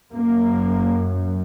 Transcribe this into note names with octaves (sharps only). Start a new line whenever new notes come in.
F#2 A#3